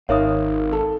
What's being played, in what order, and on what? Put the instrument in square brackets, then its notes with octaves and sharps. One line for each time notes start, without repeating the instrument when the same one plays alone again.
[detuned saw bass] G#1 [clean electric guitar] D#4 A#4 F5 [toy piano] C#5 E5 D#6
[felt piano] A4